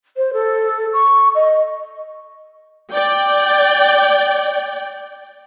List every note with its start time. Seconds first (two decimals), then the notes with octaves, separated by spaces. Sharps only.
0.16 C5
0.33 A4
0.93 C#6
1.35 D#5
2.92 D5 G5